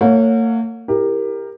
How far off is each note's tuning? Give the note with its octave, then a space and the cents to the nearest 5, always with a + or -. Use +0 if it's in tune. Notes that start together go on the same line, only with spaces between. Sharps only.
A#3 -45 C#5 +0 F#5 -40
E4 +0 G4 +20 A#4 +0